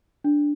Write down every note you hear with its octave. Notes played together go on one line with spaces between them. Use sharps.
D4